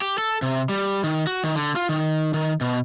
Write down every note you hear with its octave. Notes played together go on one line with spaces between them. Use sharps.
G4
A4
C3
G3
D#3
F#4
D#3
D3
F4
D#3
D#3
B2